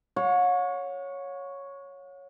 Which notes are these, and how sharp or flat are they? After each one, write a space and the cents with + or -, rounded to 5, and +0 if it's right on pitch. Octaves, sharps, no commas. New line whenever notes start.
C#5 +0 F#5 -45